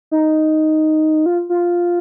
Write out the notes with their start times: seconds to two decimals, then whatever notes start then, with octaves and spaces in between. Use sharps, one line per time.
0.11 D#4
1.26 F4
1.49 F4